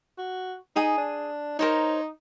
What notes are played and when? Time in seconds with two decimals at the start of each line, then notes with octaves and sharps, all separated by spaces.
0.18 F#4
0.76 D#4 G#4 G#5 D#6
0.98 D4
1.59 D#4 A#4 C5 C#5